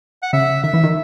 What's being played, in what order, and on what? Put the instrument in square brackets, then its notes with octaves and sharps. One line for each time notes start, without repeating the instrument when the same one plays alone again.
[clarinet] F#5
[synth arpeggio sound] C#3 [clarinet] E5
[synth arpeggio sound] D#3 [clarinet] E5
[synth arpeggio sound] E3
D#3